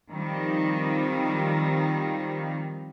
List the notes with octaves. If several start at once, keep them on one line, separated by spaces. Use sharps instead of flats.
D#3 F3 G3 C4 D#4